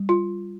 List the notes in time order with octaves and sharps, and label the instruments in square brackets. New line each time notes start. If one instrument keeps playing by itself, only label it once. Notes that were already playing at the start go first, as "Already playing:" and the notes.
Already playing: [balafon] G3
F4